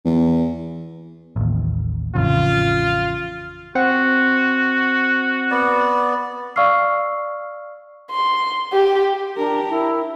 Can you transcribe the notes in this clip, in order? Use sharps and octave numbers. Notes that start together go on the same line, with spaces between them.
E2
A1 D#2
A1 F2 C#3 F4
C4 F#4 C5 F#5
B3 D5
D5 F5 C#6 E6 F6 C7
C6
G4
D4 G4 A#4
E4